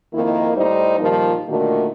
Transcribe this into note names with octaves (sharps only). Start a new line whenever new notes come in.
F2 D#3 A#3 D#4 E4
A2 G3 D#4 C5
A#2 D#3 F3 G3 A#3
A#2 D3 D#3 A3 F#4